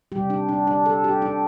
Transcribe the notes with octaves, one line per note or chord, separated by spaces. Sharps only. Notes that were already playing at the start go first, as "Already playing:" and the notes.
G3 G4
C3
D4
D4
D4
A4
G4
D4